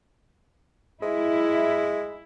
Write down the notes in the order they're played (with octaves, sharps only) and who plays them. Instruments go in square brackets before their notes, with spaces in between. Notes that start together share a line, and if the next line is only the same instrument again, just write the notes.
[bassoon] G#3 [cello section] E4